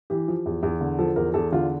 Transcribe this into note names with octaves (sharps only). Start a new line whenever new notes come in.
E3 G4
F3
E2
E2
D3
F3 A4
E2 A#4
E2 A4
D3 F4